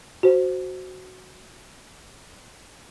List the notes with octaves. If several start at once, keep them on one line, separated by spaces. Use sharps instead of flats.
F#4 C5